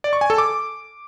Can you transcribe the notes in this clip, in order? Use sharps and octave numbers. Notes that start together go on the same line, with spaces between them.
D5
C#6
G#5
A4
D6